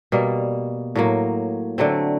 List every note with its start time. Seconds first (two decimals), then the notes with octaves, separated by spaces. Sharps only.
0.12 B2 G3 A#3
0.95 A2 F#3 A#3
1.78 D3 F#3 A3 C4